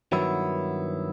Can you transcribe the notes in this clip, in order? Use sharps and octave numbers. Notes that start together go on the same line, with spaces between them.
G2 D#3 F#3 B3 E4